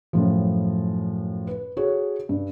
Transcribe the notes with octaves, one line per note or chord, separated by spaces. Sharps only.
F#2 A2 F3
B4
F#4 G#4 A4 C#5
G2